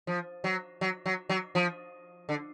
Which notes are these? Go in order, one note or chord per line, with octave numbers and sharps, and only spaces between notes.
F3
F#3
F#3
F#3
F#3
F3
D3